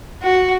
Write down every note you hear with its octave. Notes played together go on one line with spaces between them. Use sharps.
F#4